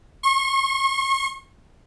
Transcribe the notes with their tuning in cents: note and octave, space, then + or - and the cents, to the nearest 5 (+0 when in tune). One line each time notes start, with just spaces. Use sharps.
C#6 -40